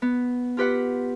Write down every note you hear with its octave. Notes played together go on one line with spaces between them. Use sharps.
B3
F4 G4 B4 F#5